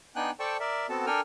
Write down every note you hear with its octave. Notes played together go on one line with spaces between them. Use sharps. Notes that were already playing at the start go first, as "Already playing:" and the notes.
B3 D4 D#4 G5 G#5 F#6
A4 C5 D5 G5 A5 C#6
A#4 D5 E5
B3 C4 F#4 A4 A5
D4 A4 A#4 G5 G#5 F6